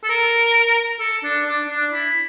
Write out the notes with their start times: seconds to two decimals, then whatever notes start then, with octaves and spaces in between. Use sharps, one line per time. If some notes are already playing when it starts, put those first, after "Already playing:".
0.03 A4
0.09 A#4
1.00 A4
1.24 D4
1.47 D4
1.70 D4
1.92 E4